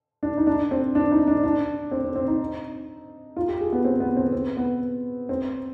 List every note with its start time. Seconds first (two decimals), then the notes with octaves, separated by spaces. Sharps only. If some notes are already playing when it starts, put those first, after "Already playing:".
0.23 D4
0.37 D#4
0.47 D4
0.71 C4
0.95 D4
1.12 D#4
1.27 D4
1.44 D4
1.91 C4
2.04 C4
2.16 C4
2.28 D#4
3.36 F4
3.48 G4
3.61 G#4
3.72 B3
3.85 C4
4.00 B3
4.17 C4
4.32 C4
4.57 B3
5.29 C4